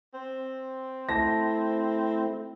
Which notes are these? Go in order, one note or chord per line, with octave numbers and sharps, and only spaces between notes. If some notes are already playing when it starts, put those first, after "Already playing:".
C4
A3 E4 A5 A#6